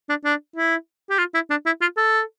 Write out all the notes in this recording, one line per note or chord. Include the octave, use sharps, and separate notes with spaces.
D4
D4
E4
G4
F4
E4
D4
E4
F4
A4